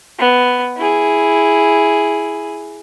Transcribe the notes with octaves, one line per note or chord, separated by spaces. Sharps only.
B3
E4 G#4